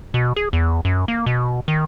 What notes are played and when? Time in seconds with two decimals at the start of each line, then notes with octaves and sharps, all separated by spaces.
0.14 B2
0.36 G#4
0.53 E2
0.85 F#2
1.08 A#3
1.26 B2
1.68 D#3